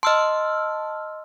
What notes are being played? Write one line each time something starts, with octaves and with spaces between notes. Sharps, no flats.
D#5 A5 C6 E6 F6